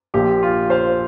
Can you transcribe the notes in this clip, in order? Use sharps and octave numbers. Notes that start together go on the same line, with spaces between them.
A#1 A#2 F3 G4
F4
C5 F5